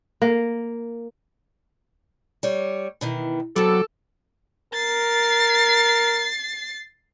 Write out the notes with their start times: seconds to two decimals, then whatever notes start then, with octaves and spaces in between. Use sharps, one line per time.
0.22 A#3
2.43 G3 C#5
3.01 B2 D#3 E3
3.56 C3 F#3 B3 A4 D6
4.74 A#4 A6 C7